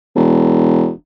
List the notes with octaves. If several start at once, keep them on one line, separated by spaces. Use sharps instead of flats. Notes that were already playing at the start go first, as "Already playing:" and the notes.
E1